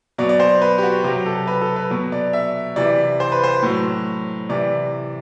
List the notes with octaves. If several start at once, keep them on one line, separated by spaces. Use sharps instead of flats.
B2 F#3 D5
D5
C5
B4
G4
F#4
C3 F#3 G4
A4
B4
A4
B4
B2 F#3
D5
E5
C3 E3 D5
C5
B4
C5
A2 F#3
C3 E3 D5